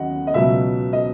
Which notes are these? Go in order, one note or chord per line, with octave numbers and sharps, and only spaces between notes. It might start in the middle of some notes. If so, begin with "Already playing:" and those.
Already playing: D#2 C#3 F#3 D#5 F#5
D#5
C#2 B2 F#3 E5
D#5